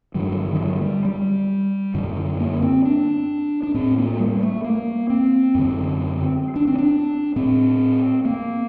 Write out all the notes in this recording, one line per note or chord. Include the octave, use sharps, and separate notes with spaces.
G2 D3 F#3
F#3
D#3
F#3
G3
G3
F#2 D3
A#3
C4
D4
D4
A2 C4
A#3
G3
A3
A#3
C4
F#2 D3
D4
C4
D4
A2 C4
A#3